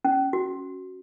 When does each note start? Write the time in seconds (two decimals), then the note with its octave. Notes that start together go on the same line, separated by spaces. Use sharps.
0.05 C#4
0.33 F#4